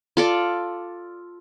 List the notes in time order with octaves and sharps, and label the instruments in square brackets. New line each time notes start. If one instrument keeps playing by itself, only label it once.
[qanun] F4 A4 D5